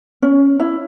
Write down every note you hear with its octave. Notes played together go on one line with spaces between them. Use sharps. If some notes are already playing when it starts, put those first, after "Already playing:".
C#4
E4